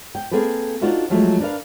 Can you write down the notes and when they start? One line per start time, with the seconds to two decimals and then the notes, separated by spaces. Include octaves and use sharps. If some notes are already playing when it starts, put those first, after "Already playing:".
0.15 G5
0.31 A#3 C4 G#4 A4 B4
0.81 D4 D#4 F4 F#4 C5
1.10 F3 F#3 G#3 A3
1.40 D4 A#4 B4 F5